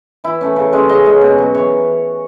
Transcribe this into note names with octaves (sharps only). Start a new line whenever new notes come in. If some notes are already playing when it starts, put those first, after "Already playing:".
E3 E4
A3 C#4
C#3
G#3 C#4
C#3 D#5
G#3 C#4
B2
F#3 C#4
E3 C#5